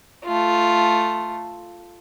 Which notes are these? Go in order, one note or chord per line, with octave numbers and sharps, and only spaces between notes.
A3 F4